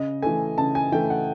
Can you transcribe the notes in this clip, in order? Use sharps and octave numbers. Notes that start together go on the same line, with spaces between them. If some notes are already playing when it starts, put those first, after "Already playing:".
Already playing: C#3 D#5
E3 A3 G#5
C#3 A5
G#5
E3 A3 G5
F#5